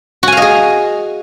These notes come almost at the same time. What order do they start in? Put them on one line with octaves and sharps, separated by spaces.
F#4 G#5 F5 D#5 G#4